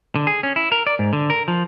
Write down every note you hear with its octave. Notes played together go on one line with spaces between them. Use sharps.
D3
G#4
C#4
E4
A#4
D5
G#2
D3
A#4
F3